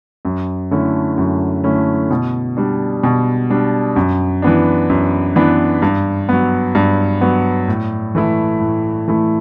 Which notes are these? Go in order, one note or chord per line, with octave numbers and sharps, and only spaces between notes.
F#2
D3 A3 C#4 E4
F#2
D3 A3 C#4 E4
B2
G3 D4
B2
G3 D4
F#2
E3 B3 D4
F#2
E3 B3 D4
G2
F#3 B3
G2
F#3 B3
A2
E3 A3 E4
A2
E3 A3 E4